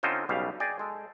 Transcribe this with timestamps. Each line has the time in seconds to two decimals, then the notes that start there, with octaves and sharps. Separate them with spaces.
0.03 D3 C4 C#4 D#4 F4 C5
0.29 B1 C#3 G3 F5
0.60 G#4 D5 D#5 G5 G#5
0.79 G#3 A4